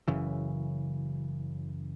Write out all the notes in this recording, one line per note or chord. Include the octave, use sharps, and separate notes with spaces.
F#1 F#2 C#3 E3